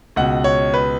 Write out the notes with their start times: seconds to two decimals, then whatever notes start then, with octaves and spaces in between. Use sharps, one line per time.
0.16 C#2 B2 F#5
0.44 C#5
0.74 B4